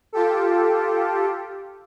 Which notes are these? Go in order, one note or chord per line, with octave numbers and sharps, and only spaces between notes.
F4 G4 A4